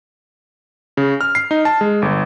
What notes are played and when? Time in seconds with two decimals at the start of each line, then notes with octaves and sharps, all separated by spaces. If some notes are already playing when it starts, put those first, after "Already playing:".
0.97 C#3
1.21 F6
1.35 C7
1.51 D#4
1.65 A5
1.81 G#3
2.02 G1